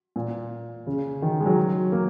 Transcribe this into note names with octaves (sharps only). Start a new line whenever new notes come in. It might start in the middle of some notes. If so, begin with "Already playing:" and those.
A#2
C#3
D#3
G#3
F#3
A#3